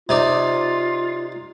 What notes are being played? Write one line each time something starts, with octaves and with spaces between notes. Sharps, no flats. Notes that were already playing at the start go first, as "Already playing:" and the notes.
C3 D#4 F4 D5